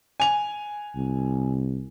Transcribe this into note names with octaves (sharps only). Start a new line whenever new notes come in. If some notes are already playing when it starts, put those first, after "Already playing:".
G#5 F7
C2